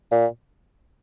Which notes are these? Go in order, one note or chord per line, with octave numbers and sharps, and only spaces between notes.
A#2